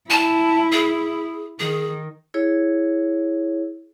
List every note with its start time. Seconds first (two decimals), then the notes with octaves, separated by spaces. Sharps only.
0.10 E4 A5
0.72 G#4
1.60 D#3 G#4
2.34 E4 G#4 C#5